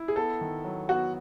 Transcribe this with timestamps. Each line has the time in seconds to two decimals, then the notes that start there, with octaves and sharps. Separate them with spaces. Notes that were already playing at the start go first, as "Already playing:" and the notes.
Already playing: E4
0.08 G#4
0.16 B3 A4
0.41 D#3
0.64 F#3
0.89 B3 F#4